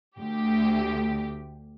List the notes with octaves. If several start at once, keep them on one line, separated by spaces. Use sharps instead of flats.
D2 G4